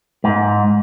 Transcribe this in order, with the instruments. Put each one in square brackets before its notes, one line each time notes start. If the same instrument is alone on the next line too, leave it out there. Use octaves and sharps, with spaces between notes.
[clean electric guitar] G#2